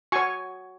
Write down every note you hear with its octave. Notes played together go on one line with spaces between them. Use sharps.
F#4 C#5 G#5 C#6